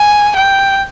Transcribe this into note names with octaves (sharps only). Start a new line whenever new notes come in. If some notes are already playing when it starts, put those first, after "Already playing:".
Already playing: G#5
G5